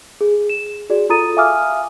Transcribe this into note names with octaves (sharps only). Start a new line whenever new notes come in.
G#4
E7
F#4 G#4 D5
F4 A4 A#5 D#6 A6 D#7
E5 F5 G#5 D6 D#6 F6